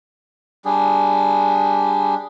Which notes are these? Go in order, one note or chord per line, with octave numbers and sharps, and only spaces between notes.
G3 D4 G#4